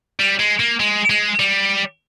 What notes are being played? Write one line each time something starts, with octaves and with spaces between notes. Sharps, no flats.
G3
G#3
A#3
G#3
G#3
G3